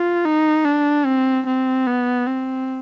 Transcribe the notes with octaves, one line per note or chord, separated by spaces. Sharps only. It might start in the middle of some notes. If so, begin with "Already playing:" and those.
Already playing: F4
D#4
D4
C4
C4
B3
C4